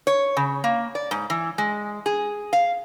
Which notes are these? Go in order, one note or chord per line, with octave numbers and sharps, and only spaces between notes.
C#5
C#3
A#3
D5
G#2
E3
G#3
G#4
F5